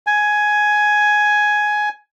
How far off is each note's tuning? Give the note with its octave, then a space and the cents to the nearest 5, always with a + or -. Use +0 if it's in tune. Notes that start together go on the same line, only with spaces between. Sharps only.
G#5 +10